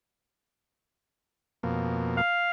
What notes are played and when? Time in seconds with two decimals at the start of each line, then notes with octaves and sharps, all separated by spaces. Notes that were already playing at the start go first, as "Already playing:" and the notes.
1.63 F2 B2 A#3
2.17 F5